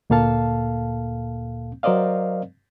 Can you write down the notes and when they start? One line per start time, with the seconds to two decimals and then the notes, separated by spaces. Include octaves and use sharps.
0.10 D2 A#2 A#3 A4 F5 A5
1.83 F#3 A#4 C5 D5 D#5 F5